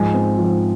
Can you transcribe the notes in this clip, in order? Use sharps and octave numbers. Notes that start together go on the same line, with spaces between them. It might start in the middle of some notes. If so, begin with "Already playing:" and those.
Already playing: G#2 F3
C4
F3